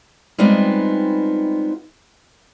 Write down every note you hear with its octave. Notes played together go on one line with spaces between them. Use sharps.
G3 G#3 B3 C4 D#4 F4